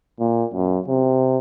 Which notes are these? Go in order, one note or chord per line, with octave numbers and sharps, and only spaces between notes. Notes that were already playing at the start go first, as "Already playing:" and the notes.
A#2
F#2
C3